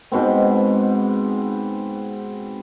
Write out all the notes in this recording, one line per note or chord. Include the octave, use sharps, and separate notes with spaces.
G#2 B2 B3 C4